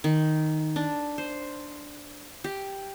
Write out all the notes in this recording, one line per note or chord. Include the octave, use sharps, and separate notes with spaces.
D#3
D4
C5
G4